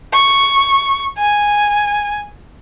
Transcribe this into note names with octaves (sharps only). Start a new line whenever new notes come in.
C#6
G#5